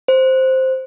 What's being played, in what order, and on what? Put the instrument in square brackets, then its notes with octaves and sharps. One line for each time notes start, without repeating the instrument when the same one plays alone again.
[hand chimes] C5